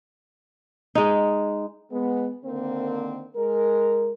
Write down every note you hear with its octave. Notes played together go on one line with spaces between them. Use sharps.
G#3 D#4
G#3 B3
D3 D#3 A#3 C4
G#3 A#4